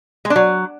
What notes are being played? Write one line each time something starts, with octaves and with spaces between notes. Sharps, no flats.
G#3
D4
F#3